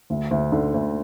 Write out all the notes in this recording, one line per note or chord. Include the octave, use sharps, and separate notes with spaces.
D2
D2
D3
D2